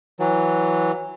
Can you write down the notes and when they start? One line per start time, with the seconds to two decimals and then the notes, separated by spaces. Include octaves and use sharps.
0.20 E3 F#3